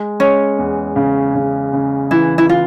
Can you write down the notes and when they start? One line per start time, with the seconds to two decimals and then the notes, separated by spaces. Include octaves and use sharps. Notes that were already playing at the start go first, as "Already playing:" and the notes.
Already playing: G#3
0.20 G#3 C#4
0.58 E2
0.96 C#3
1.35 C#3
1.73 C#3
2.11 E3 E4
2.38 E4
2.49 F4